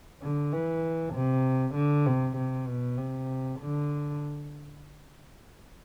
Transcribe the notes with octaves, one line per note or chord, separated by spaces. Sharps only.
D3
E3
C3
D3
C3
C3
B2
C3
D3